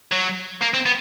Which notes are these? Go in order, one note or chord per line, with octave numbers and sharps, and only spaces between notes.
F#3
A#3
C4
B3